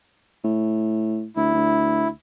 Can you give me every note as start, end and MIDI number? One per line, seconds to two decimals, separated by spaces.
0.44 1.27 45
1.36 1.51 38
1.36 2.08 64
1.54 2.10 38